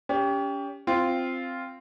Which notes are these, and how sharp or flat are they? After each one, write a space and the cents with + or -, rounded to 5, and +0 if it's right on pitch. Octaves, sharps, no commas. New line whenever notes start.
C#4 +35 G4 +10
C4 +0 F4 -5